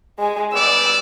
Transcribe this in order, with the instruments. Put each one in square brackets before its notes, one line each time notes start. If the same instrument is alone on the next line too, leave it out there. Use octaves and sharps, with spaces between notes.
[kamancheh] G#3 G#5
[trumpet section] G3 B3 D5 [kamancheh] E6